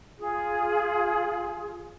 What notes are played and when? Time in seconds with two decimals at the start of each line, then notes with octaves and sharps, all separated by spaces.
0.19 F4 G#4